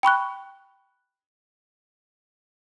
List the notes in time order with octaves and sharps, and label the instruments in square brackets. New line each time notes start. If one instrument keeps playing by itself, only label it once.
[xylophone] G5 B5 C#6 F#6